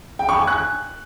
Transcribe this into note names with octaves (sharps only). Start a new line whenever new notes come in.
G5
C#6
G#5
F#6